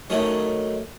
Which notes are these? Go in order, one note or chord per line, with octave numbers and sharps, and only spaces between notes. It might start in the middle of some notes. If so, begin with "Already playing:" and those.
D#3 F#3 A3 C#4